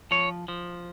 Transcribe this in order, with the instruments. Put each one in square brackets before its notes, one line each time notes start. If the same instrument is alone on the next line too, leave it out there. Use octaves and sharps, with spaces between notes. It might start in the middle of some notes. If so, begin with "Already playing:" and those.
[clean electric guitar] F3 C#5
F3